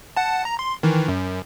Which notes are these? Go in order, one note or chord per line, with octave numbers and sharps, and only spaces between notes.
F#5 A5
A#5
C6
D#3 E3
F#2